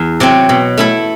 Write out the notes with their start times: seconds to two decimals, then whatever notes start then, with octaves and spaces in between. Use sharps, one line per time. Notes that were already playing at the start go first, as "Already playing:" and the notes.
Already playing: E2
0.20 C3 F#3 C4
0.49 B2
0.77 A3 E4 A4